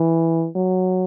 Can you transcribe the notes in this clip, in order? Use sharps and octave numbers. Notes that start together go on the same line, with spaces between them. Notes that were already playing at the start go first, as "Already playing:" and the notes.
Already playing: E3
F#3